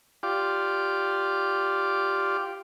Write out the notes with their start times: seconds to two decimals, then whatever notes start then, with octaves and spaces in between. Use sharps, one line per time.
0.23 F4 G4 D5